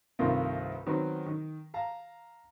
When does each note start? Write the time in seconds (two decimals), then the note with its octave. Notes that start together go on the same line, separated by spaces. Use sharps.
0.19 C2 G2 D#3 A3 F4 A#4
0.86 D#3 F#3 B3 C4
1.26 D#3
1.74 F5 A5 A#5